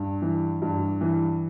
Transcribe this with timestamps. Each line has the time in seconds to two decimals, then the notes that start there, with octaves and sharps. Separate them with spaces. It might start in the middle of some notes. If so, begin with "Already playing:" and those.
Already playing: G2
0.22 E3
0.62 G2
1.01 E3